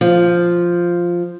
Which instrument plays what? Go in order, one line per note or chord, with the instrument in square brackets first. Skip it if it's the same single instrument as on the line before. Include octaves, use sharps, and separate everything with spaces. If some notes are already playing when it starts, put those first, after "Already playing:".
[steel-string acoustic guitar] F3